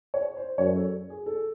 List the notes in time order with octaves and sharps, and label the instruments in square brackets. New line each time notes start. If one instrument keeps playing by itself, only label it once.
[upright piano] C#5
C5
[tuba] F#2 [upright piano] C#5
[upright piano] A4
G#4
A4